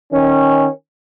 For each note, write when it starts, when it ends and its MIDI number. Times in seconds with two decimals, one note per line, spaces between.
0.12 0.67 51
0.12 0.67 61